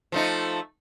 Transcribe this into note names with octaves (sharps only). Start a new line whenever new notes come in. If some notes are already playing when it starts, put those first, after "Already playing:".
F3 A3 D#4